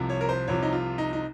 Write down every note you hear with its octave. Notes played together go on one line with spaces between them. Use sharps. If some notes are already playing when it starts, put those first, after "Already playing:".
Already playing: C2 C3 F3
C#5
A#4
C5
C2 C3 F3 C#5
D#4
F4
D#4
D#4